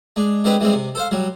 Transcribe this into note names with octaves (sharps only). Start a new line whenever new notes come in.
G#3 D4
D3 G#3 C4 G4 B4
E3 G3 G#3 C4
C3
A4 C5 F5
F#3 G3